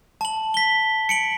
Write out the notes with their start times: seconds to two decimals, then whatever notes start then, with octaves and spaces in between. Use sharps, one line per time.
0.21 A5 F#7
0.54 B6 G7
1.09 C#7 D7 F#7